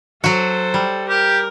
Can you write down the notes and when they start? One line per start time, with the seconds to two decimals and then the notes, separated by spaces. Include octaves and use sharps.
0.24 F#3 F#4 A4 C5
0.74 G3
1.09 G4 A#4